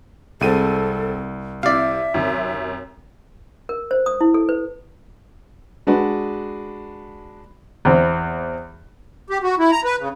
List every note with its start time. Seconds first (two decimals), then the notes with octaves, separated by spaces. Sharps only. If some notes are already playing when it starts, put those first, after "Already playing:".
0.41 C2 G#3 C4 A4 D#7
1.63 C3 E4 D5 E5 F5
2.14 F#2 C3 D#3
3.69 A#4
3.91 C5
4.06 D#6
4.21 E4
4.34 A4
4.49 B4
5.87 G#3 D4 F#4 B4
7.85 E2 C4
9.30 G4
9.43 F#4
9.58 E4
9.71 A#5
9.85 B4
9.99 C#3